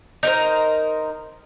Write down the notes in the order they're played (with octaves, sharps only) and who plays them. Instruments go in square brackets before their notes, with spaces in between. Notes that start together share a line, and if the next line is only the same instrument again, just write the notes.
[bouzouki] D#4 A#4 C5